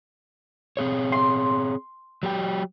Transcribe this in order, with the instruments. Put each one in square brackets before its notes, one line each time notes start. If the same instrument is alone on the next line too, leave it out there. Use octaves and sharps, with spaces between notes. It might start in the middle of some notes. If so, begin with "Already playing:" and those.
[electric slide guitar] C4 G#4 C#5
[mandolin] C6
[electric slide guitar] F#3 G4 G5